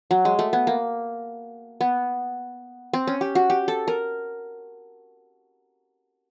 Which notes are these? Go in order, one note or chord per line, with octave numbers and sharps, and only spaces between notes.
F#3
G#3
A3
B3
A#3
B3
C4
C#4
G4
F#4
G4
A4
A#4